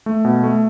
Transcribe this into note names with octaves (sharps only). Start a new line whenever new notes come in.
A3
B2
A3